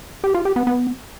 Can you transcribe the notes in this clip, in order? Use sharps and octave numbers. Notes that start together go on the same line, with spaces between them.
G4
F4
G4
B3
B3